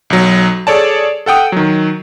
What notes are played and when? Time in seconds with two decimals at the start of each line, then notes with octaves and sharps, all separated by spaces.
0.10 B1 F#3
0.67 G#4 A4 C#5 D5 A5
1.26 A4 F#5 G5 D#6
1.52 D#3 F#3